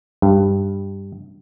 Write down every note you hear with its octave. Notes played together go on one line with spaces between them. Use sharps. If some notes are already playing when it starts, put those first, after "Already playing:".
G2